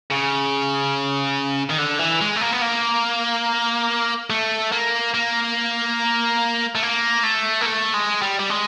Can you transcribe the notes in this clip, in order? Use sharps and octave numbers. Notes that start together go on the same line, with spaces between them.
C#3
D#3
D3
E3
G#3
A3
A#3
B3
A#3
A3
A#3
A#3
A3
A#3
A3
A#3
A3
G#3
G3
G3
G#3